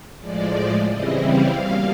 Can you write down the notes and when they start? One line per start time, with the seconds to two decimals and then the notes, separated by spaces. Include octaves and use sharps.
0.20 A2 F3 G#3 D5
0.88 C#3 E3 G3 C4 E4 D#5
1.23 F5
1.58 B2 G3 A#3